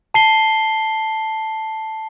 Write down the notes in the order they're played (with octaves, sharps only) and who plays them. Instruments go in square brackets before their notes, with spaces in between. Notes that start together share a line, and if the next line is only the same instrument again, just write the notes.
[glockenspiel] A5 C7 G7